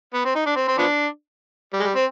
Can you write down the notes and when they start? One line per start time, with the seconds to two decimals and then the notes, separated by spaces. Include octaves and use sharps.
0.14 B3
0.25 C4
0.35 D#4
0.46 D4
0.56 C4
0.68 C4
0.78 F3 B3 D4
1.73 G3
1.80 G#3
1.83 G3
1.95 C4